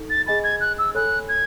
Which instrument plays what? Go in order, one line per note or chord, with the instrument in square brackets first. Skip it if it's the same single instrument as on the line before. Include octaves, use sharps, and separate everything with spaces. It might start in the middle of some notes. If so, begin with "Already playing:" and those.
Already playing: [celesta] D#4 A4
[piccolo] A6
[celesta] G#4 D#5 G#5 B5 [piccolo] A6
[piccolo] G#6
F#6
E6
[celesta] A4 C#5 G#5 B5 [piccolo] F#6
[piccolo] G#6